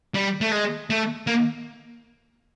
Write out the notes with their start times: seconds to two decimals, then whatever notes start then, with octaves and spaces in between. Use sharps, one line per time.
0.14 G3
0.41 A3
0.51 G#3
0.90 A3
1.27 A#3